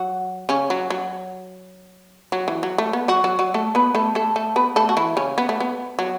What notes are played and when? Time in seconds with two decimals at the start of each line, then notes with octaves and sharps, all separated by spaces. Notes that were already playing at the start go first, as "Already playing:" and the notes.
Already playing: F#3 F#4
0.49 C#3 C#4
0.70 F#3
0.90 F#3
2.32 F#3
2.48 E3
2.63 F#3
2.78 A3
2.93 B3
3.08 F#3 F#4
3.24 F#3 F#4
3.39 F#3 F#4
3.54 A3 A4
3.75 B3 B4
3.95 A3 A4
4.15 A3 A4
4.36 A3 A4
4.56 B3 B4
4.76 A3 A4
4.89 F#4
4.97 E3 E4
5.17 C#3 C#4
5.38 B3
5.49 A3
5.60 B3
5.99 F#3